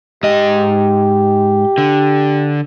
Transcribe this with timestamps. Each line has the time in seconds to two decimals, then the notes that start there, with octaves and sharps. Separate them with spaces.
0.23 G#2 G4 D#5
1.78 D3